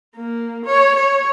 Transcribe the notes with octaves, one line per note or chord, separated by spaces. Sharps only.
A#3
C#5
C#5